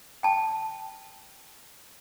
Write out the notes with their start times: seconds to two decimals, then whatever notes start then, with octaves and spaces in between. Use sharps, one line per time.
0.23 G5 A5